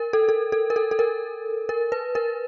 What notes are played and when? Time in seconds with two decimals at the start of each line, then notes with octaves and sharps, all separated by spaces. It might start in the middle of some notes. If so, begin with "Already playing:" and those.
Already playing: A#4
0.13 A4
0.29 A4
0.52 A4
0.70 A#4
0.76 A4
0.91 A4
0.99 A#4
1.69 A#4
1.92 B4
2.15 A#4